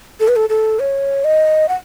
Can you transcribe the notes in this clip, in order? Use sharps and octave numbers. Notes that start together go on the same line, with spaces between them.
A4
B4
A4
A4
C#5
D#5
F#5